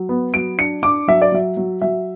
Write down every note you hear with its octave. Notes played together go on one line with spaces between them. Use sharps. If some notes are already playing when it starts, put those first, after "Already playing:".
Already playing: F#3
B3
F#3 D7
D4 C#7
D4 D6
F#3 E5
D5
F#3 E5
F#3
F#3 E5